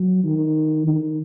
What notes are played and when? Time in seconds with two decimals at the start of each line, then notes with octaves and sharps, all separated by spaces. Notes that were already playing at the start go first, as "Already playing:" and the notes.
Already playing: F#3
0.24 D#3
0.87 D#3